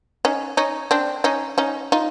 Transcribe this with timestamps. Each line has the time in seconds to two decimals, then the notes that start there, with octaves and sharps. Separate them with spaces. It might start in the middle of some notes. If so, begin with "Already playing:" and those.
0.25 C#4 D#4
0.57 C#4 D#4
0.91 C4 D4
1.24 C#4 D#4
1.58 C#4 D#4
1.92 D#4 F4